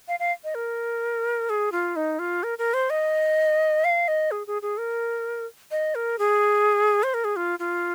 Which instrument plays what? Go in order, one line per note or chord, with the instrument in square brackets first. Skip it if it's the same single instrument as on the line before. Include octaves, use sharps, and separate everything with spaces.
[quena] F5
F5
D#5
A#4
G#4
F4
D#4
F4
A#4
A#4
C5
D#5
F5
D#5
G#4
G#4
G#4
A#4
D#5
A#4
G#4
C5
A#4
G#4
F4
F4